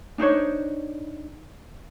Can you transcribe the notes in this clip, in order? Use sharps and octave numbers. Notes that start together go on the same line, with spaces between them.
D4 D#4 C5 C#5